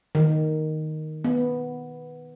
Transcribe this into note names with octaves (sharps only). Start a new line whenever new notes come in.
D#3
B3